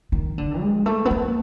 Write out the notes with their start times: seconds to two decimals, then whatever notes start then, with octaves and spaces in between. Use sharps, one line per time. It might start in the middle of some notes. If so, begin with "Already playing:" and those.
0.12 D#3
0.38 D3
0.61 G#3
0.86 A3
1.05 B3
1.11 A#3